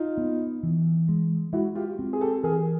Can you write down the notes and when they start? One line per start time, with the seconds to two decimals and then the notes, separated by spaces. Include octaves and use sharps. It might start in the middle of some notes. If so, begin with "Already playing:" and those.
Already playing: D#4 F4
0.17 B3
0.63 E3
1.09 G#3
1.53 G#3 E4 F#4
1.75 F4 G4
1.99 C4
2.13 G#4
2.21 G4 A4
2.43 E3 G#4 A#4